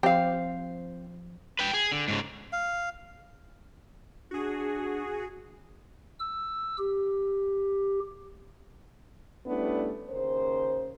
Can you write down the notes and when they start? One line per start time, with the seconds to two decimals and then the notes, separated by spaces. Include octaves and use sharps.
0.03 F3 C4 G4 C5 F5
1.59 B4 G5
1.73 G#4
1.92 D3
2.08 G#2 C#3
2.53 F5
4.31 D4 F#4 G#4
6.20 E6
6.78 G4
9.46 G3 A3 B3 C#4 D4 E4
10.09 D#2 C#3 A#4 C5